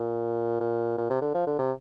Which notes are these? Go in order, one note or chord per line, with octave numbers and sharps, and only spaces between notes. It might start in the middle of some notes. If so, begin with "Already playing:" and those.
Already playing: A#2
A#2
A#2
C3
D3
F3
D3
C3